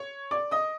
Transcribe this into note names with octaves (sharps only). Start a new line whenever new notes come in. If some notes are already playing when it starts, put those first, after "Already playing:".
Already playing: C#5 C#6
D5 D6
D#5 D#6